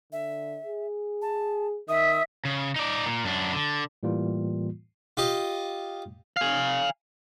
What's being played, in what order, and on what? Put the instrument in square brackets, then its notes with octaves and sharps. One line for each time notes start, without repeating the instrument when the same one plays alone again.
[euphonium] D3 [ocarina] E5
[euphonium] G#4
[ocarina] A5
[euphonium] D#3 [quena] E5 [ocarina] D#6
[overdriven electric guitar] C#3
D#4 D5
A#2
F#2 D4
D3
[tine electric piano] A2 E3 G3 A#3 F4
[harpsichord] F4 G4 D#5
[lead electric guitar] F5 G#5